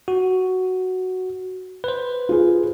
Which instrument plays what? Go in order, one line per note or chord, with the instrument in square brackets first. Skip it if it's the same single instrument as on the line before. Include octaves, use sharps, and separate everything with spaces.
[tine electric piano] F#4
B4 C5
[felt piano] F4 G#4